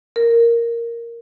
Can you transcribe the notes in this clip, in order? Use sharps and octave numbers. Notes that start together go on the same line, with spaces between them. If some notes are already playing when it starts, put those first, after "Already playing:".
A#4